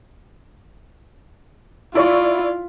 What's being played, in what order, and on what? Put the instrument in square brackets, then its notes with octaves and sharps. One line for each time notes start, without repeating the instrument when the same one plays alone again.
[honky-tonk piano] E4 D5 C#6 [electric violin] F4